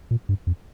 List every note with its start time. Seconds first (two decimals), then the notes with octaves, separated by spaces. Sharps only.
0.11 A#2
0.29 G2
0.47 F2